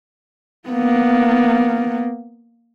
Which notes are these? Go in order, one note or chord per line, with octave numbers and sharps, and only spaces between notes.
A#3 B3